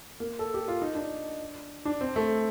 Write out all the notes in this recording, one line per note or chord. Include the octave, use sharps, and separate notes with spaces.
A#3
A4
G4
F4
D#4
D4
D4
C4
A3